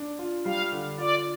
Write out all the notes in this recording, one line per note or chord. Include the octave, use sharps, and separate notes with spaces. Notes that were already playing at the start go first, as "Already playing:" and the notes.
Already playing: D4
F4
G3 F5
D3
F4 D5